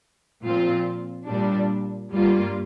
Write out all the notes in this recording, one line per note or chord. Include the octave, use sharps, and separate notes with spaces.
A#2 F3 C4 F4
A#2 G3 D4
G2 G3 A#3 F4